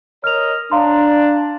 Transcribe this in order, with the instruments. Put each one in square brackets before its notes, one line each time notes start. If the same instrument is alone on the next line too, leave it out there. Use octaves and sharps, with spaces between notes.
[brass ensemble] A#4 C#5 D#5 [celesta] F6 F7
[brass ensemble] D4 [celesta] F5 A#5 C6